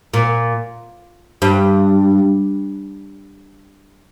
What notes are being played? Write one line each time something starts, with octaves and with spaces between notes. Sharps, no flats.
A#2
G2